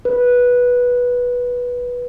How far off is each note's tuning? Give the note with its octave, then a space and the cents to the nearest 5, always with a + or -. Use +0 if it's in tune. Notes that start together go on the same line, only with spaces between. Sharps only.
B4 -10